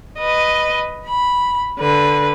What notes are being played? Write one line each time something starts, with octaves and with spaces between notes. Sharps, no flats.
B4 D#5
B5
D3 B4